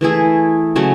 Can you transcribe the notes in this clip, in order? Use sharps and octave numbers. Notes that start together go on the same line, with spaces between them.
E3 A3 E4 G#4
C#3 F#3 A3 C#4